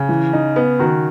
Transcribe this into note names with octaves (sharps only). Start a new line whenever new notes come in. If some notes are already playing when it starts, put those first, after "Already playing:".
Already playing: C#3
E3
D#4
B3
D#3 F#4